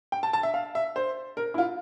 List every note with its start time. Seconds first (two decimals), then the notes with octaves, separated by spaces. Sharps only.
0.12 G5
0.23 A5
0.33 A5
0.43 E5
0.54 F5
0.75 E5
0.96 C5
1.37 A#4
1.54 E4
1.58 F4